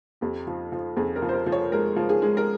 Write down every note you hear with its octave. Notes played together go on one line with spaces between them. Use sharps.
F2 G4
F3
F3
F2 G#4
A#4
F3
C5
A#4
F3
C#5
G#3 A#4
F3
G#4
G#3
A#4